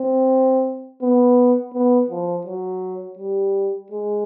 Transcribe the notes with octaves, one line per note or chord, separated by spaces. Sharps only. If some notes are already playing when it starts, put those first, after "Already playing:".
Already playing: C4
B3
B3
F3
F#3
G3
G#3